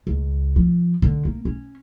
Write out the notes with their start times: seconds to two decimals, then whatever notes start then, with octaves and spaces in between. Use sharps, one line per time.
0.07 C#2
0.56 F3
1.02 D3
1.25 A#3
1.45 C#4